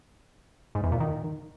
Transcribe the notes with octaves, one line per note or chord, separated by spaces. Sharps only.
G#2
E2
A#2
D#3